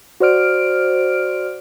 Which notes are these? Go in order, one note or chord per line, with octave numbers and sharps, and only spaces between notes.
F#4 C5 D5 F6 D7